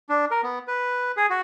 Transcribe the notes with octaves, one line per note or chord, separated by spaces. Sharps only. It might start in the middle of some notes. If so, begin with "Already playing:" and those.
D4
A#4
B3
B4
G#4
F#4